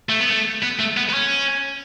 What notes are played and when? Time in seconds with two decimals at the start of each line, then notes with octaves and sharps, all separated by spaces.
0.09 A3
0.20 B3
0.30 A3
0.63 B3
0.79 A3
0.97 B3
1.09 B3
1.14 C#4